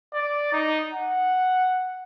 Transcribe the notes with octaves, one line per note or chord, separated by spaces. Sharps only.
D5
D#4
F#5